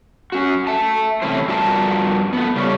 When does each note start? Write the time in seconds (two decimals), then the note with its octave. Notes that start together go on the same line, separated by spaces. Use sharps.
0.32 C#4 F#4
0.67 E5 A5
1.22 A2 C3 E3 C#4 E4 C5
1.48 G2 F3 F#4 A#4 A5
2.33 A3 B3
2.56 C#3 G3 A3 C#4